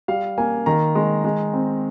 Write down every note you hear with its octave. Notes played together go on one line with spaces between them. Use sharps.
G3 F5
A#3 G#5
D#3 A#5
G#3
G#3
C4